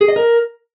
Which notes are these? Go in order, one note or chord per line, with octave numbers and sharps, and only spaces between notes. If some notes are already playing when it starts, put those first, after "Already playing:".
G#4
D#5
A#4